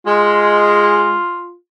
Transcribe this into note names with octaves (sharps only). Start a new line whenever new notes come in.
G#3 F4